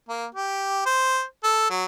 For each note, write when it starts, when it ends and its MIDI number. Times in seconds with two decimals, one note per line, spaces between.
0.09 0.25 58
0.35 0.82 67
0.86 1.23 72
1.44 1.69 69
1.71 1.85 54